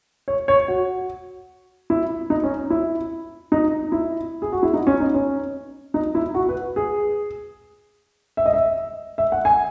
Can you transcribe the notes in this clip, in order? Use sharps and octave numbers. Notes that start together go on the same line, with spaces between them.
C#5
C#5
F#4
E4
D#4
C#4
E4
D#4
E4
G#4
F#4
E4
D#4
C#4
D#4
C#4
D#4
E4
F#4
B4
G#4
E5
D#5
E5
E5
F#5
G#5